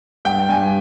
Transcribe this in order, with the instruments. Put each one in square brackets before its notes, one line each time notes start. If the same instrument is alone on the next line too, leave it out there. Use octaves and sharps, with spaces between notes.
[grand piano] G2 G5
G2 G#5